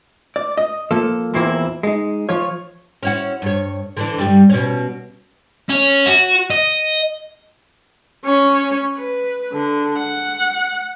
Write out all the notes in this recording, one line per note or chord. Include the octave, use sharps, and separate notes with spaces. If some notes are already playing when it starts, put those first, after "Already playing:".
D5
D#5
F3 A#3 A4
E2 A#2 A#3 C4 E4
G#3 D#4
F3 F4 C#5
C#4 E4 F#4
G2 C#5
D3 E3 D4
G2 G3
B2 C#4
C#4
F#4
D#5
C#4 C#5
B4
D3
F#5